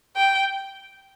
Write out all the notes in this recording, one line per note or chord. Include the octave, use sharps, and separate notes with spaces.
G5